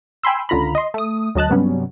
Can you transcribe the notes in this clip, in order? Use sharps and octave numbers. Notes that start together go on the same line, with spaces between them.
G5 G#5 B5 C6 E6
C#2 D3 F4 A#5 B5
D#5 C6
A3 D#6
D2 F#3 D#5 A5 F#6
G2 C3 F#3 G3 B3 C#4